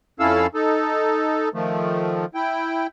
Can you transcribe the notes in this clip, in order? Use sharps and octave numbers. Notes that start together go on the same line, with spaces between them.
F2 C#4 E4 A4 F5 E6
D#4 A4
D#3 F3 A3
E4 G5